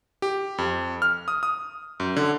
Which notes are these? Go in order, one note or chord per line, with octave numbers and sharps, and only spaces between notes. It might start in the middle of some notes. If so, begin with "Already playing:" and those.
G4
F2
F6
D#6
D#6
F#2
D3